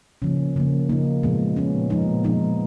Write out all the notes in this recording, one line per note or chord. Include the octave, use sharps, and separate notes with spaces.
C#3 F3 A#3 C#4
C#3 F3 A#3
C#3 F3 A#3 D#4
A#2 F3 G#3 B3
A#2 F3 G#3 B3 C#4
A#2 F3 G#3 B3 D#4
A#2 F3 G#3 B3 D#4